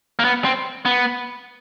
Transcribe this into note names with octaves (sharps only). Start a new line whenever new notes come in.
A#3
B3
C4
B3